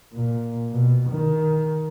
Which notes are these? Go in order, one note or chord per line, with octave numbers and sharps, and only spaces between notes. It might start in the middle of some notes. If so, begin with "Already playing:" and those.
A#2
B2
D#3